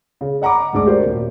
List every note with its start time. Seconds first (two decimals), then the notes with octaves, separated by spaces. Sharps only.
0.21 C#3
0.42 D#5 F#5 A#5 B5 D6
0.73 D2 G#2 D4 G#4 D6
0.86 F#4 G4 A#4 C5 D5
1.05 D#1